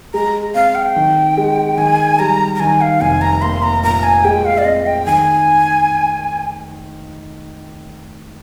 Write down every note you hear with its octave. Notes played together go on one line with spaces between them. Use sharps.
G#3 A#5
C4 F5
G5
D#3
G#3
D#3 G#5
G3 A#5
A#5
D#3 G#5
F5
F1 G#5
A#5
A#3 C6
A#5
A#2 A#5
G#5
G#3 G5
F5
D5
C4 D#5
G5
D#3 G#5